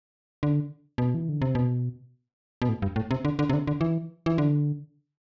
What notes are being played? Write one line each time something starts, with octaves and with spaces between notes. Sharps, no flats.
D3
B2
E3
D3
C3
B2
B2
A2
G2
A2
C3
D3
D3
C3
D3
D3
E3
E3
D3